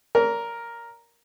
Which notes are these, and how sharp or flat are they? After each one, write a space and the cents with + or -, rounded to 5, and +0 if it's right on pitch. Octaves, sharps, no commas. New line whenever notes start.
A#4 +0 D5 -40